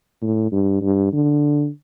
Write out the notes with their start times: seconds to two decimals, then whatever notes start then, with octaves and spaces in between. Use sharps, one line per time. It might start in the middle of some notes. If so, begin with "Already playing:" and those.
0.22 A2
0.52 G2
0.82 G2
1.13 D3